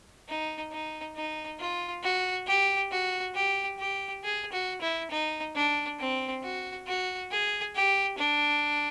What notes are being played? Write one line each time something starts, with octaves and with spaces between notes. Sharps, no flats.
D#4
D#4
D#4
F4
F#4
G4
F#4
G4
G4
G#4
F#4
E4
D#4
D4
C4
F#4
F#4
G#4
G4
D4